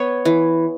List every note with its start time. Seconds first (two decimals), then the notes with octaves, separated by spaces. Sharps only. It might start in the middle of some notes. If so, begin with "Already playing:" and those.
Already playing: B3 C#5
0.25 E3